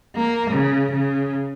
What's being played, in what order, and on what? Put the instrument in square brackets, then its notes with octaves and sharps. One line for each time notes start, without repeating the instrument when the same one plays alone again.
[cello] A#3
C#3
C#3